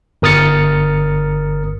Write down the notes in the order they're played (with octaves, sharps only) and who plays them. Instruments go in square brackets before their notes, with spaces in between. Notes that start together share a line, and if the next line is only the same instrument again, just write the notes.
[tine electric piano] G1 A#4 D#6 F6 A6 C#7